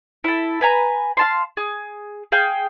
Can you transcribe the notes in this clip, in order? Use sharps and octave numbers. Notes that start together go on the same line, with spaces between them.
E4 A4
B4 G#5 A#5
F5 A5 C6
G#4
G#4 F5 G5